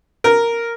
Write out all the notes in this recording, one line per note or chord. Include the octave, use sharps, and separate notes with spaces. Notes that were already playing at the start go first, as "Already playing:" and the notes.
A#4